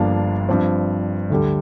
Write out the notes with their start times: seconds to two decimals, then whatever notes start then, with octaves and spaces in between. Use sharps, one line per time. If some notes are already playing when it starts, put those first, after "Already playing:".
Already playing: G1 G2 F3 A#3 D4 F5
0.49 G2 F3 C4
1.30 D2 D3 G3